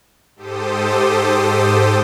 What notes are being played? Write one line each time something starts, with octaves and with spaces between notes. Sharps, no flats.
G#2 G4 A4 C5 D#6